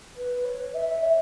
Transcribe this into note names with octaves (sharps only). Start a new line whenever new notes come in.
B4
C#5
E5
C#5